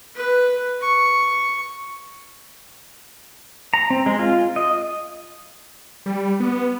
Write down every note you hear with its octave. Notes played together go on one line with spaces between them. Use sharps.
B4
C#6
A#5
C4
G#3
F4
D#5
G3
B3